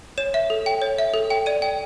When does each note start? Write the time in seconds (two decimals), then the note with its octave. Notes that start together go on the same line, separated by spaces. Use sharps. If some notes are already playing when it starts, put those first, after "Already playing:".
0.18 C#5 E7
0.34 E5
0.50 A4
0.66 G5
0.82 C#5
0.98 E5
1.14 A4
1.30 G5
1.46 D5 D#7
1.62 G5